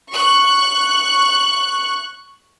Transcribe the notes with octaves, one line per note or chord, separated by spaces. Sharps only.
C#6 F#6